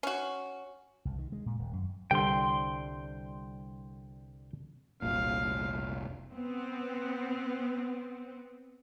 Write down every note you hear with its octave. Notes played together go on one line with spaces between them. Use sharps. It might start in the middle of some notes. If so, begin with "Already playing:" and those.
C#4 F#4
C2
D#3
G#3
A#2
D#1
F#2
C2 D3 G3 G5 C6
F1 C2 A#2 F5
B3 C4